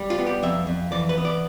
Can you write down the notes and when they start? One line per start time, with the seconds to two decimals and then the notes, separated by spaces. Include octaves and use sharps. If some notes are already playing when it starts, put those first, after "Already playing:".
Already playing: G3
0.10 F4
0.18 B3
0.27 G4
0.43 F2 E5
0.67 F2
0.92 E3 D5
1.09 B4
1.18 B3
1.25 D5